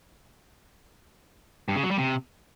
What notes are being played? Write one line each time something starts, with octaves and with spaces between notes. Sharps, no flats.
G2
C#3
F#3
G3
C3